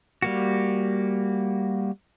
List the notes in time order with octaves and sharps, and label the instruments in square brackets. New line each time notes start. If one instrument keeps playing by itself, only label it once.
[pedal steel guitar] G3 A#3 F#4